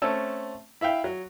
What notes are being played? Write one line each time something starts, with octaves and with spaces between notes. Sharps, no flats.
A3 C4 C#4 A5 E6
E4 E5 F5 G5
F#3